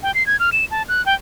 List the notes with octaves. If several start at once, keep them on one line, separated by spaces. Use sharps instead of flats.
G5
C7
G#6
F6
E7
A5
F#6
G5